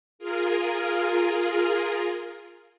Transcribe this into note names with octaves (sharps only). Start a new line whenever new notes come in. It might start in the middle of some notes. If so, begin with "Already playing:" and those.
F4 G#4 A#4